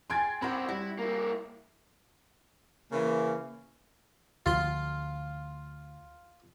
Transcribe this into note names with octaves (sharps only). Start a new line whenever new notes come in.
G#4 G5 G#5 C6 G#6 A6
C4 E4 A#4 C5 F#5 G5 B5
G3 E4 F#4
A#3 E4
C#3 E3 A#3
D2 F3 F4 C6